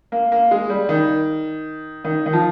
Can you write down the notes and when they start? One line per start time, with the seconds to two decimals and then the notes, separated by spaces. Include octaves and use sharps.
0.12 A#3
0.32 A#3
0.51 G#3
0.70 G3
0.89 D#3
2.04 D#3
2.26 D#3
2.33 F3